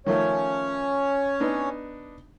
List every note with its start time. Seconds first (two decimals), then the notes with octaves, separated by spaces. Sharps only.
0.06 D#3 F3 A3 C#4 C#5
1.40 B3 D4 D#4